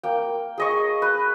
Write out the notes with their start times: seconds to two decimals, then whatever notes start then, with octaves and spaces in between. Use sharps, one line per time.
0.03 A#3 G5
0.58 G#4 D#5 C#6
1.02 B4